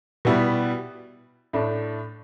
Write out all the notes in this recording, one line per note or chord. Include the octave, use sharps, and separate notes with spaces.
B2 G3 B3 E4
A2 A3 D4